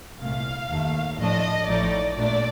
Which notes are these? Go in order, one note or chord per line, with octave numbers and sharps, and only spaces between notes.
C2 A#2 A3 F5
D#2 D#3 A3
A2 F3 A3 D4 D#5
A1 A2 F3 A3 D#4 D5
A#2 A3 D4 D5